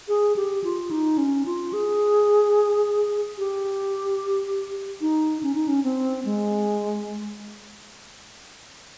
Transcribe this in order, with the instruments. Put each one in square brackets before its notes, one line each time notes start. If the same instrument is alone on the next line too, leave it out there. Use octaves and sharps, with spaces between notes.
[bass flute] G#4
G4
F4
D#4
C#4
F4
G#4
G4
D#4
C#4
D#4
C#4
C4
G#3